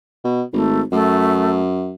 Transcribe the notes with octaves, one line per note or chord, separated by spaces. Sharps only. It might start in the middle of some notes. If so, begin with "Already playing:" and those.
B2
G#1 A3
F#2 A3